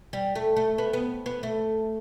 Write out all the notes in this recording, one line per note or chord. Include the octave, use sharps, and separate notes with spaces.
G3
A3
A3
B3
B3
B3
A3